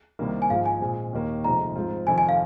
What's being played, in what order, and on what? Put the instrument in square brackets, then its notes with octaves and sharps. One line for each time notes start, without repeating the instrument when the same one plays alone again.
[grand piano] C2 C3 D#3 A#3
[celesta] G#5
[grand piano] G#1 G#2 F3 [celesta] F5
[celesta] G#5
[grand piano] A#2 G#3 C4 G#4
D#2 D#3 A#3
[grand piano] F1 F2 F3 G#3 D#4 [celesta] A#5
[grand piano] G#2 F3 C4 F4
[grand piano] F1 F2 D#3 [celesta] G#5
[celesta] G#5
F5